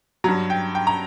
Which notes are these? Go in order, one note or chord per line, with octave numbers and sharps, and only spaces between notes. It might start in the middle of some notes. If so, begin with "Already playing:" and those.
G2 F#3 A#5
G5
G5
A#5